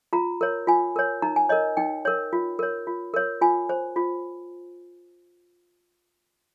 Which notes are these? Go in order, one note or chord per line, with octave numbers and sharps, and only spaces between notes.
F4 A#5
A#4 C#5
F4 G#5
A#4 C#5
D#4 A#5
G#5
A#4 C#5 D#5
D#4 G5
A#4 C#5
F4
A#4 C#5
F4
A#4 C#5
F4 G#5
C5
F4